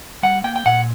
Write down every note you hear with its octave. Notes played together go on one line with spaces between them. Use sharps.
G3 F#5
A#3 G5
G5
A#2 F#5